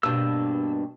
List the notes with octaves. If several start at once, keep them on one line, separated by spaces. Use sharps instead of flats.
G2 B2 A#3 D4 E6